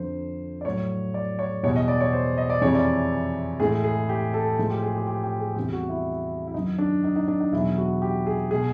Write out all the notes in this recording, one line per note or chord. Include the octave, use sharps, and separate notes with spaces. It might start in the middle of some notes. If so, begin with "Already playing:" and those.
Already playing: F2 D3 F3 C5
D5
A2 F#3 C#5
D5
C#5
E2 B2 G3 C#5
D#5
D5
C#5
C5
D#5
D5
F2 C3 E3 G#3 C#5
D5
A2 E3 G#3 G#4
G#4
G4
A4
A2 F3 G#3
G4
G#4
G4
G4
G4
G#4
E2 C3 E3 G3 G4
F#4
E4
E4
F#2 D#3 F#3 D#4
D4
D#4
D#4
D4
D#4
E2 B2 F#3 E4
F#4
G4
G#4
B2 G#3 G#4